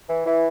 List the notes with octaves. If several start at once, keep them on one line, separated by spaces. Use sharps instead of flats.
E3
E3